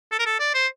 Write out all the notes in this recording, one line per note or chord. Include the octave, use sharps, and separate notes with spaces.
A4
A#4
A4
D5
C5